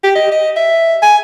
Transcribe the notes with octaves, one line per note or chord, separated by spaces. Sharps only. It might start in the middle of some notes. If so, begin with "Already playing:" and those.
G4
D#5
D#5
E5
G#5